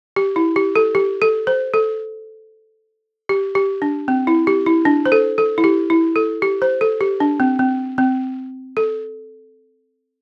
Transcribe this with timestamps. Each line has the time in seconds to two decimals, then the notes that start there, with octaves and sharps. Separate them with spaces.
0.16 G4
0.36 E4
0.56 G4
0.76 A4
0.95 G4
1.22 A4
1.47 C5
1.74 A4
3.29 G4
3.55 G4
3.82 D4
4.08 C4
4.27 E4
4.47 G4
4.66 E4
4.85 D4
5.06 C5
5.12 A4
5.38 A4
5.58 E4
5.64 G4
5.90 E4
6.16 A4
6.42 G4
6.62 C5
6.81 A4
7.01 G4
7.20 D4
7.40 C4
7.59 C4
7.98 C4
8.77 A4